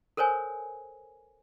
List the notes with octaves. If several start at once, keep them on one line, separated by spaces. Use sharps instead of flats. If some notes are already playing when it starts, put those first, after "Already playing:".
A4 A#4 C5 C#5 G#5